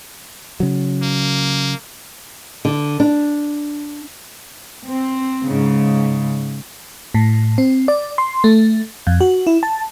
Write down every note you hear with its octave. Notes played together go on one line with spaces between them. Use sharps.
C#3 F#3
A#3
D3
D4
C4
G#2 C#3
A2
C4
D5
C6
A3
F2
F#4
E4
A5